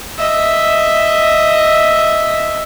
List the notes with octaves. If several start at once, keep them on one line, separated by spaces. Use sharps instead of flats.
D#5 E5